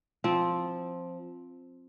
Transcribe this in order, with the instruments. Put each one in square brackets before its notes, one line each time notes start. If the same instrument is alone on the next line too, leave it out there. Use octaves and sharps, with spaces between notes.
[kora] F3 C4